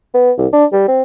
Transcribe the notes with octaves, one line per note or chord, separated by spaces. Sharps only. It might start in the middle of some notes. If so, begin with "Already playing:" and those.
B3
C2
D4
G3
C4